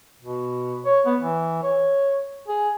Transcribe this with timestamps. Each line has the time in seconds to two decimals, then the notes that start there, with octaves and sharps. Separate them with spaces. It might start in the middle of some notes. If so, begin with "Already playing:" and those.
0.22 B2
0.86 C#5
1.06 B3
1.21 E3
1.63 C#5
2.48 G#4